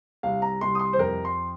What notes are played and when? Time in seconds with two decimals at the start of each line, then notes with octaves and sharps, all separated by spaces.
0.23 C2 F5
0.42 A#5
0.61 C2 C6
0.75 D#6
0.79 C6
0.93 C5
0.98 F2 A#4
1.25 C6